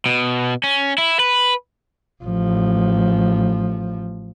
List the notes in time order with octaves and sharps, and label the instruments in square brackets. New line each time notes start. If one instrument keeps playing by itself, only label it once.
[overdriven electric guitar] B2
C#4
E4
B4
[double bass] A1 F3